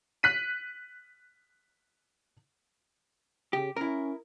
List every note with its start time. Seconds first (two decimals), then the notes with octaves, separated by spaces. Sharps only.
0.23 F#6 B6 D#7
3.53 C#3 G4
3.76 C#4 E4 A#4